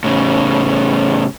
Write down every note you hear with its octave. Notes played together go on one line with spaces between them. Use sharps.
A2 C#3